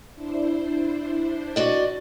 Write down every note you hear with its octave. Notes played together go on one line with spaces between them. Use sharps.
D4 E4 C5
F#4 D5 D#5